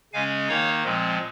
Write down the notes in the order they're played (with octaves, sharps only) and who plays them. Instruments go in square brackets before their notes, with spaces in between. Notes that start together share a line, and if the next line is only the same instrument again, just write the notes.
[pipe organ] C#3 G#3 C#4 F5 G#5
D#3 A#3 D#4 C#5 F5
A#2 F3 G#3 C4